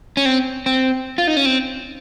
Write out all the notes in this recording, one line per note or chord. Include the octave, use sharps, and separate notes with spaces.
C#4
C4
C4
F4
D#4
C#4
C4